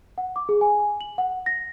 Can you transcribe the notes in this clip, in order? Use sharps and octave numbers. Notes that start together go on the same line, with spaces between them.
F#5
D6
G#4
G#5
F#7
F#5
A#6